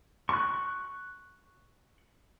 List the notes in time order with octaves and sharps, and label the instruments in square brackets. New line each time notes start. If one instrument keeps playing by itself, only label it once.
[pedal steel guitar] C#6 F#6